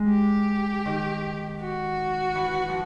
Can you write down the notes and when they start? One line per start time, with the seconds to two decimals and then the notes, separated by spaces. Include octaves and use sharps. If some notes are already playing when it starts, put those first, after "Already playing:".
Already playing: G#3
0.09 G4
0.85 D#3
1.61 F#4
2.35 E3
2.68 F3